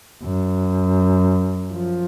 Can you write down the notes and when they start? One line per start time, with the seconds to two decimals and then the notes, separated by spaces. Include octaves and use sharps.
0.24 F#2
1.73 F3